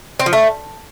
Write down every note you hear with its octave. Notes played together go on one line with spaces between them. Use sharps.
C4
F3
A3